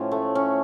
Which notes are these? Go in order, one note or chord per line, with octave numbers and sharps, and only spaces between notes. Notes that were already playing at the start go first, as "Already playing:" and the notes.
Already playing: A2 F3 C#4
A3
C#4